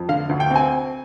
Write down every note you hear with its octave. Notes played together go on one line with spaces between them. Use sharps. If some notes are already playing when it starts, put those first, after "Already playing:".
Already playing: F2
D3 F5
D2
G5
C4 G#5